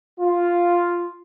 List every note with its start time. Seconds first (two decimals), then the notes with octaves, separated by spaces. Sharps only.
0.19 F4